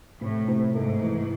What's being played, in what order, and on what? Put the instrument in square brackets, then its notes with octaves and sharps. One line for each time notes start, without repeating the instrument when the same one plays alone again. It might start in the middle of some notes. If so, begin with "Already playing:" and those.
[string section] A2 [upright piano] C3
[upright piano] C3
[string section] G#2 [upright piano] A3
[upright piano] E3